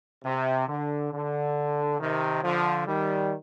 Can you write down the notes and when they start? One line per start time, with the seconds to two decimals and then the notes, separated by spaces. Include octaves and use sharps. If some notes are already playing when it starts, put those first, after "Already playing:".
0.24 C3
0.69 D3
1.13 D3
2.00 C3 D#3
2.44 D3 F3
2.87 D#3 G3